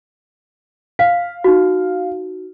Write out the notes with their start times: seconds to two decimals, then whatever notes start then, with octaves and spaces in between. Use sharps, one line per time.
0.99 F5 B6
1.44 D#4 F#4